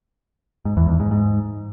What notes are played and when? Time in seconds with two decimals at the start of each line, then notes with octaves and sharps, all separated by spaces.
0.65 G#2
0.77 E2
0.88 E2
1.00 G#2
1.11 G#2